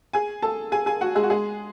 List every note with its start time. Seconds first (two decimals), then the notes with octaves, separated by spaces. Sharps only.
0.13 G#4 G#5
0.42 A4 A5
0.72 G#4 G#5
0.86 G#4 G#5
1.01 F#4 F#5
1.15 G#3 G#4
1.23 F#4
1.30 G#3 G#4